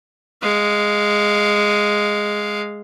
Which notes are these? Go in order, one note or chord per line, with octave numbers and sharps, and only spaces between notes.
G#3 F5